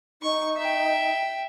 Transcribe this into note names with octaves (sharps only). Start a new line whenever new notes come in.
D#4 C#6
E5 G5